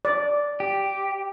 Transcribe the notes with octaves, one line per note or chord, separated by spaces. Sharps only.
D5
G4